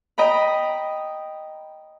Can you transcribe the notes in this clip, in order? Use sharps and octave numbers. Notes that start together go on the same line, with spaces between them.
D#5 G5 A#5 B5